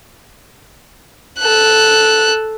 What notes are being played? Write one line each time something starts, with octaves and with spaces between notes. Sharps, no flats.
A4 F#6